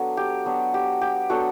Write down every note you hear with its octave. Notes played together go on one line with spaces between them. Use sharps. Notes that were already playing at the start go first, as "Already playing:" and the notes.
Already playing: F#3 B3 D4 A4
G4
F#3 B3 D4
G4
G4
F#3 B3 D4 F#4 A4